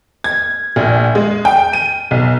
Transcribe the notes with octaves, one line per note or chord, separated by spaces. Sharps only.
G#6
A#1
G#3
G5
D#7
B1